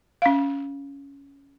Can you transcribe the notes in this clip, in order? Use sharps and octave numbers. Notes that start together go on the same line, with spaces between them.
C#4 F5